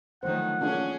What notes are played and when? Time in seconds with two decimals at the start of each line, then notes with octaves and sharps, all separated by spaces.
0.23 D3 D#3 F3 F#3 A3 C5 F#5
0.61 A#3 C#4 D4 F4 G#4